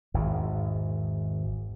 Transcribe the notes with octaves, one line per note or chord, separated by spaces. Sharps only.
G#1 E2